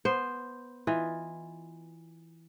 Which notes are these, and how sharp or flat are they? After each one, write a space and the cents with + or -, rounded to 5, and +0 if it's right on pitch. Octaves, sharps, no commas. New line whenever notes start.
B3 -10 C5 +0
E3 +0 F4 +5 D#5 +0